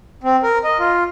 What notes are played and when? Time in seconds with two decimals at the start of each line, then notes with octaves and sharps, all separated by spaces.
0.24 C4
0.43 A#4
0.64 D#5
0.79 F4